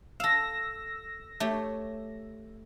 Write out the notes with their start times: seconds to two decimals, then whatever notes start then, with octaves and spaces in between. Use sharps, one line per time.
0.20 A4 F5 E6 A#6
1.40 A3 G4 C#5